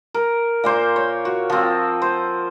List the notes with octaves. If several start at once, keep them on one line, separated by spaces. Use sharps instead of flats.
A#4
A#2 A#3 C5
C#5
F#4
F3 C4
C5